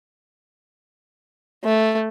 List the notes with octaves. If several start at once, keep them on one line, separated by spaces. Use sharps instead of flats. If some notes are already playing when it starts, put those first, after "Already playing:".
A3